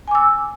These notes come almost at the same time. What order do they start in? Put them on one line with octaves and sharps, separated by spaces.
G#5 D6 E6